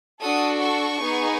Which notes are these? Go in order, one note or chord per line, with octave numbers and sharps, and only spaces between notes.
D4 F#4 A4 D#6
C#6
B3 D#4 G#4